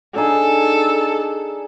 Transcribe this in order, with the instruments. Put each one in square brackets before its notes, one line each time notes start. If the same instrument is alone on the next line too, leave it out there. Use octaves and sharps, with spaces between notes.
[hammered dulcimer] D4 D#4 G#4 [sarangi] A4